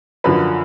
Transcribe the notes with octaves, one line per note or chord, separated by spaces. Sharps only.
F#2 D3 F3 B4